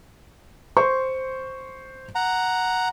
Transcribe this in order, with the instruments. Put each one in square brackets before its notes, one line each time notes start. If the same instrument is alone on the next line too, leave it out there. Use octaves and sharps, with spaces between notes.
[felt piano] C5 C6 C#6
[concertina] F#5 A#5